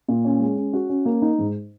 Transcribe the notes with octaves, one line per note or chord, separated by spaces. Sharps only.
A#2
C#4
G#3
C#4
F#4
C#4
A#3
D#4
G#2